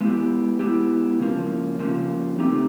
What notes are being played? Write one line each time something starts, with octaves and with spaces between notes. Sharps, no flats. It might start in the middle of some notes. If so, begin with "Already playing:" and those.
G#3 B3 E4 G4
G#3 B3 E4 G4
C#3 F3 A#3
C#3 F3 A#3
A3 C4 D#4 G4